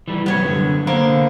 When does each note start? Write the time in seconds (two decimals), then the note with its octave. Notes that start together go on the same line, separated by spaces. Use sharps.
0.08 E3 G3
0.26 C3 F#3 G3 B3 C#5
0.43 F#2 D3
0.87 D3 A#3 B3 C5